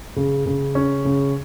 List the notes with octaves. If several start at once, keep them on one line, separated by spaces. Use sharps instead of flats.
C#3
C#3
C#4
C#3